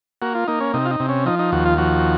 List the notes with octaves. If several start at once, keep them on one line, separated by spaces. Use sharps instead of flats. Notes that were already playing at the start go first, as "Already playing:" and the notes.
A#3 F#4
F4
A#3 D#4
C#4
C3 D#4
F4
D#4
C3
C#4
F3 D#4
D#4
D#2 F#4
F4
F3 F#4